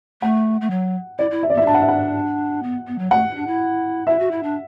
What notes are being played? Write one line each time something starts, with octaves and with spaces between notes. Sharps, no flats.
A3 F#5
A3
F#3
E4 D5
E4
E5
D5
B3 E5
E4
D4 A5
F#5
E5
F#5
B3
B3
F#3
A3 F#5
E4
D4
E4
E4 E5
F#4
E4
D4